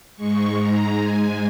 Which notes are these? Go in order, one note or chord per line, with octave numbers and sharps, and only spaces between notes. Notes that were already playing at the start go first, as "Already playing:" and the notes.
G#2 G#3 C#6
A#5
G#5